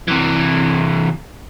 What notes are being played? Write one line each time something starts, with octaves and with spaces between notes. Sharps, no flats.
C3 E3